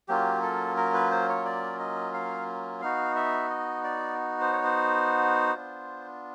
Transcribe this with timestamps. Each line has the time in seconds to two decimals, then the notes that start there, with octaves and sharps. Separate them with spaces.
0.08 F#3 A#3 C#4 F4 G4
0.43 A4
0.77 A#4
0.94 B4
1.11 C5
1.29 C#5
1.45 D5
1.79 D#5
2.13 F5
2.82 B3 D#4 F#4 F5
3.16 E5
3.50 D#5
3.84 D5
4.40 C5
4.53 C#5
4.64 C5
5.54 B3 D4 F4